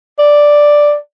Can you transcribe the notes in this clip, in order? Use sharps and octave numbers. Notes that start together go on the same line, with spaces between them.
D5